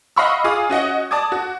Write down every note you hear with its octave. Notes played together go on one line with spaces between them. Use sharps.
D#5 F5 F#5 B5 C#6 E6
F4 G#4 F5 D6 D#6
C#4 F#4 D#5 F#5
D5 A5 D6 D#6 G#6
F#4